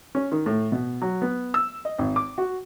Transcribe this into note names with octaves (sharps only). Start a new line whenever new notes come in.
C#4
D#3
A2
B2
F#3
B3
E6
D#5
G#1
D6
F#4